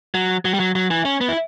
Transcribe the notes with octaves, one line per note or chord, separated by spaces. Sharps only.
F#3
F#3
G3
F#3
F#3
E3
C#4
B3
E4